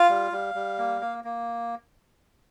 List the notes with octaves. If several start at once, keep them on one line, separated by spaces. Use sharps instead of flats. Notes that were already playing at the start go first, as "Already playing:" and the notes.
Already playing: F4 F5
G3
G3
G3
A#3
A#3
A#3